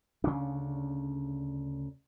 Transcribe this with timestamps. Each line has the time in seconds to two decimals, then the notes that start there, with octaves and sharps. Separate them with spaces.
0.24 D2 C#3 C#4 D4